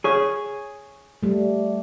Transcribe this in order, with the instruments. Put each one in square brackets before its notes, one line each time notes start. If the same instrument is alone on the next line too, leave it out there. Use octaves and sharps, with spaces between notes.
[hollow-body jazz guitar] G#4 C#5
[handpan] G3 A3